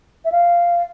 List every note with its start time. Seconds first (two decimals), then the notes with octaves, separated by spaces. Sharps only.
0.25 E5
0.32 F5